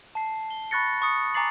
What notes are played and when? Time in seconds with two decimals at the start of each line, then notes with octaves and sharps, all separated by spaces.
0.15 A5 C7
0.50 G7
0.71 B5 C#6 F#6 A6 A#6 C#7
1.02 C#6 D#6 C#7
1.34 G#5 A#5 D6 A6 C7 F#7